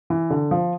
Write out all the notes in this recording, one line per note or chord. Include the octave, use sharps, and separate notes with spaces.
E3
D3
F3